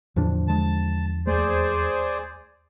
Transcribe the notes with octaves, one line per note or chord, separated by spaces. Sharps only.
E2 A2 D3 F3 D4
D3 G#3 A5
D#2 A3 G#4 C5 D5